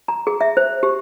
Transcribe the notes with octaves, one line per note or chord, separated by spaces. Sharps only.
A#5
G#4
E5
C5
G4